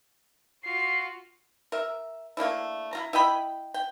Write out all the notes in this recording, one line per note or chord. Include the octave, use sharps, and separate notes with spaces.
F4 F#4 C7
A#4 E5
A3 A#3 D4 E4
E4 F4 A#5
E4 D#5 G5 B5
G5